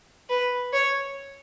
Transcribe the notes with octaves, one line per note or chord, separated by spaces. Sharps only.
B4
C#5